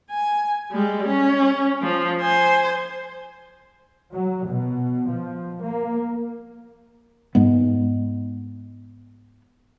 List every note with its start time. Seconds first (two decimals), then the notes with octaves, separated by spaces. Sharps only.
0.11 G#5
0.72 G3 G#3
1.08 C#4
1.82 F3
2.20 C5 G#5
4.13 F#3
4.48 B2
5.10 F3
5.63 A#3
7.35 G#2 G#3 B3